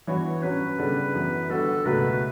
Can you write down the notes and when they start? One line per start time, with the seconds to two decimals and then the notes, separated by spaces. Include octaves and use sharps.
0.07 G2 E3 B3 F#4 C#5
0.43 G2 F#3 C#4 B4
0.78 C#3 G3 B3 D4 A4
1.14 F#2 E3 B3
1.50 D3 G3 B3 D4 F#4 A4
1.85 C#2 B2 F#3 A3 B4